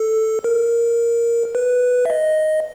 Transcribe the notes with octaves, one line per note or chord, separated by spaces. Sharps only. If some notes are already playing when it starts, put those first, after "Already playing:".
Already playing: A4
A#4
B4
E5
D#5